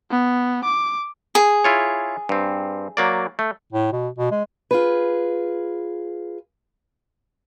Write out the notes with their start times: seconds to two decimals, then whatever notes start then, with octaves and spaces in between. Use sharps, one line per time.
0.11 B3
0.64 D6
1.35 G#4
1.64 E4 F4 C#5
2.29 G2 C4
2.97 F#3 A#3 D5
3.39 A3
3.72 A2
3.92 B2
4.18 B2
4.31 G#3
4.71 F4 G#4 B4